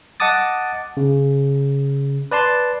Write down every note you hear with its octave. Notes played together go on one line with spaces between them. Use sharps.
D#5 F#5 A5 D6 D#6 A6
C#3
B4 D5 A5 C6